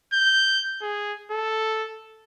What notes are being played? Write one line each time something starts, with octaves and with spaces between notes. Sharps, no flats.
G6
G#4
A4